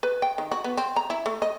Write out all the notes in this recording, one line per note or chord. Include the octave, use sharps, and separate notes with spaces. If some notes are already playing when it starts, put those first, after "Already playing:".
B4
G5
D#3
F#4
B3
C4
A#5
E4
A3
D#5